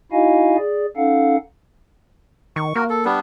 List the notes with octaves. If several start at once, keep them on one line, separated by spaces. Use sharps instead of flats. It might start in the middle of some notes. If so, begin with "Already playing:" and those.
D#4 E4 F#4 D#5 F5 G#5
G#4 D5
C#4 D#4 A4 F5 F#5
D#3 C#6
A#3 F#4 A#4
A4
G3 B3 D4